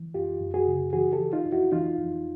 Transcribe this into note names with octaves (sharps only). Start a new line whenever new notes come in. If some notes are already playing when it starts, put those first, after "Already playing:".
Already playing: E3
F#2 F4 G4
F#2
F#4 G#4
C#3
E3 F#4 G#4
G4 A4
E3
D#4 F4
F2
E4 F#4
E3 D#4 F4
F2